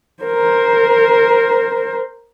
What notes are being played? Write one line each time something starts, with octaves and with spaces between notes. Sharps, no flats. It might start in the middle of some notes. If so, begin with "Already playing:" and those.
A#4 C5